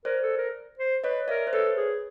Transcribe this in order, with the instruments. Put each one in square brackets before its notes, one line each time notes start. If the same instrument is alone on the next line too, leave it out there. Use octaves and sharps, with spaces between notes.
[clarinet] A#4 [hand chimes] C5 D5
[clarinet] A4
A#4
C5
[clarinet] B4 [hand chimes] C#5 D#5
[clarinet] A#4 [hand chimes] D5 E5
[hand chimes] C5
[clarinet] A4 [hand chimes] B4 C#5
[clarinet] G#4